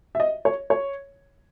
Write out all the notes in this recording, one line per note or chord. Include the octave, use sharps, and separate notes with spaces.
E5
D#5
C#5
C#5